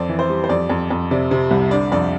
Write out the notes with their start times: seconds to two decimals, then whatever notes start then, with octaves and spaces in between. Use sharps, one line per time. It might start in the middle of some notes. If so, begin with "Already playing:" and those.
Already playing: F2 C4 D5
0.09 E3
0.19 C5
0.29 G3
0.44 C5
0.49 F2 D5
0.70 F2
0.90 F2
1.11 C3 D5
1.31 C3
1.51 C2
1.71 D3 D5
1.92 F2 D5